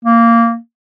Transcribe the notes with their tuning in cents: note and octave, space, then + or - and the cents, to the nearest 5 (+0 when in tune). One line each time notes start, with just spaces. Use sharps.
A#3 -10